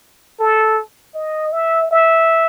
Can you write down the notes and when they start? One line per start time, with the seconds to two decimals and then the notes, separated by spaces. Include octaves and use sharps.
0.40 A4
1.14 D#5
1.52 E5
1.91 E5